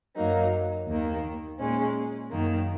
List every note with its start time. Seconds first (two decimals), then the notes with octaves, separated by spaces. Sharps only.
0.17 F#2 F#3 A#3 D#4
0.87 D#2 D#3 A#3
1.59 A#2 G#3 C#4
2.29 F#2 D#3 A#3